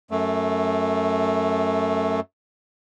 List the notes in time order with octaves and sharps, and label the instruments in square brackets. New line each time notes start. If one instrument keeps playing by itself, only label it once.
[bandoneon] F#2 A3